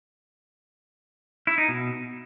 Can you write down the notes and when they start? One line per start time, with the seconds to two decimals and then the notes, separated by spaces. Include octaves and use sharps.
1.47 E4
1.58 D#4
1.68 B2